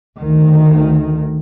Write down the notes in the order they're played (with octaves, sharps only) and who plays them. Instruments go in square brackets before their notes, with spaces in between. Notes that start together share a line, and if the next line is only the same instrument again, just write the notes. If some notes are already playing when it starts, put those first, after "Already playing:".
[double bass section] D2 D#3